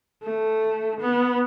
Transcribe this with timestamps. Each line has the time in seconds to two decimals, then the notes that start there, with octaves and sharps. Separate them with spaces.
0.23 A3
1.00 B3